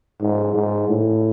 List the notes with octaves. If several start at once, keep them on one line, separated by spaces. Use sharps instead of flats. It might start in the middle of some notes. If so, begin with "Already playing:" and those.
G#2
G#2
A2